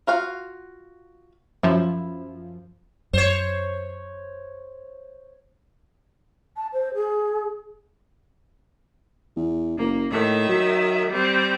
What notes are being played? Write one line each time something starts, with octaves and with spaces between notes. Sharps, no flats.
F4 F#4 F5
F#2 F3 E4
F#2 C5 C#5
A5
C5
G#4
E2
F#1 A#3
A2 D#3 E5
F#3
G3 C4